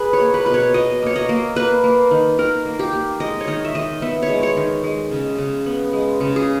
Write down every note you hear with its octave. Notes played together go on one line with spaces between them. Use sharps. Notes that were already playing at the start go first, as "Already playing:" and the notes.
Already playing: G#4 B4
C#5
A#3
B4
B2 B4
C#5
B2 D#5
A#3 C#5
D#5
A#3
A#3 B4
A#3
D#3
D#3 A#4
A#3
G4
A#3
G#3 D#5
C#5
D#3 D#5
E5
D#3 D#5
B3 E5
C#5
G#3
C#5
D#3
G#3
C#3
C#3
B3
G#3
C#3
G#4